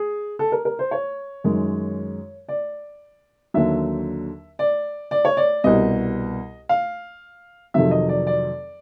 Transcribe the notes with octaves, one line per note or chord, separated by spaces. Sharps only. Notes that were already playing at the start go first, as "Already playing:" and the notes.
Already playing: G#4
A4
A#4
A#4
C5
C#5
F#2 D#3 G#3
D5
D#2 D3 F#3 E5
D5
D5
C#5
D5
C2 B2 G3 D#5
F5
F2 C3 D#3 F#3 E5
D#5
D5
D5